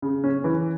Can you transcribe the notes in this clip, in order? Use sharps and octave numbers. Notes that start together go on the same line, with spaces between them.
C#3
C#4
E3